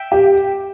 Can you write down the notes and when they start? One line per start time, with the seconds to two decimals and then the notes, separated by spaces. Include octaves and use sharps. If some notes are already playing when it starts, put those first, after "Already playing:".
Already playing: E5 G5
0.12 G4